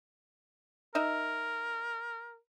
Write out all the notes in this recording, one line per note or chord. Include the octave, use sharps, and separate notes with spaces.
D#4 A#4 E5